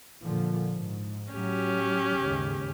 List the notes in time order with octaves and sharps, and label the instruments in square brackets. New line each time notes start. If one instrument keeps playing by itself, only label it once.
[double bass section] A#2 D3 F3
G#2
[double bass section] A2 F#3 [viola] C#4 G4
[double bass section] D#2 G#2 C#3